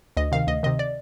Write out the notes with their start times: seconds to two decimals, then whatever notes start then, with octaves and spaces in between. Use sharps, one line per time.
0.17 D2 D#5
0.32 C3 D#3 F5
0.47 D2 D#5
0.63 C3 D#3 D#5
0.79 D5